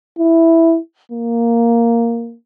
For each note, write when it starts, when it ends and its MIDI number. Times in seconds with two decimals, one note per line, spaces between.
0.19 0.78 64
1.12 2.35 58